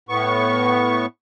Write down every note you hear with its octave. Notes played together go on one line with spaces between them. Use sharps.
A2 B3 C#6